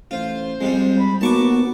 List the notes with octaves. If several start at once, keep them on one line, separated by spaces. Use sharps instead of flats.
A1 F4 C5
F2 G3 G#3
B5
D#2 B3 F#4 A5 C#6 D6